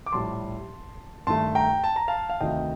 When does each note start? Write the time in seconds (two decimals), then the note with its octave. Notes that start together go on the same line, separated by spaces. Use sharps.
0.06 D6
0.12 A#1 A2 G3 A5 C6
1.27 G2 D#3 A3 A5 C6
1.55 G5 A#5
1.84 A5
1.96 A#5
2.08 F5 A5
2.30 F5
2.41 D2 C3 D#3 A3 D#5 G5